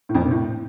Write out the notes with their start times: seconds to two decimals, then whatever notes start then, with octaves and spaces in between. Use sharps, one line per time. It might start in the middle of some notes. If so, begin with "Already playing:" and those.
0.09 A2
0.15 F2
0.20 A#2
0.25 C3
0.31 A2